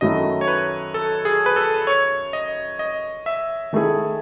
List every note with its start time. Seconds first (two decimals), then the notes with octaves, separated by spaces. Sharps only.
0.01 F#2 D#3 F#3 A3 E4 D#5
0.41 C#5
0.48 B4
0.94 A4
1.25 G#4
1.46 B4
1.56 A4
1.87 C#5
2.33 D#5
2.79 D#5
3.26 E5
3.73 D#3 A3 E4 G#4